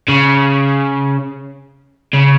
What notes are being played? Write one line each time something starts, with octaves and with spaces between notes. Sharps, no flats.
C#3
C#3